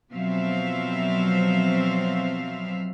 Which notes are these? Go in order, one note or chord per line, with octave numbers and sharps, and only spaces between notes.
B2 F3 F#3 C4 E5 F5